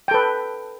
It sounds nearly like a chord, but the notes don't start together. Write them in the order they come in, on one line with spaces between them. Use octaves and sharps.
G5 A4 B4